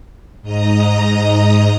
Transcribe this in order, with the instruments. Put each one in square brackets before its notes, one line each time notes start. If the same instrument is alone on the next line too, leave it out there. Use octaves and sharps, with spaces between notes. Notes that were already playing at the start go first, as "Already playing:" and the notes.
[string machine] G#2 D#5 A#5 D#6